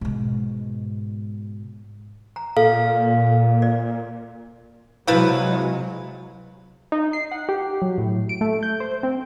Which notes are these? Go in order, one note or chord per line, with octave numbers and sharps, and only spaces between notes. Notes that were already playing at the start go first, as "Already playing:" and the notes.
G#2 B2
A#5
A#2 A4 F5
D5
C3 F3 F#3 G#3 E4 B4
D#4
C7
F#5
G4
F#3
A2
D7
A3
G6
C5
C4